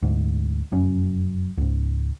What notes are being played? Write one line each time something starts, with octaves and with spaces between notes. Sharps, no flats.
D2 G#2
F1 F#2 C#4
C#2 G#2